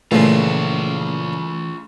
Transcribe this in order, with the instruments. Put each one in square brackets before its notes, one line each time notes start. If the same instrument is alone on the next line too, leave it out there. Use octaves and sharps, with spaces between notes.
[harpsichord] A#2 C#3 F3 [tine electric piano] E3 [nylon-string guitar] A3 [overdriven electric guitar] F4 G#4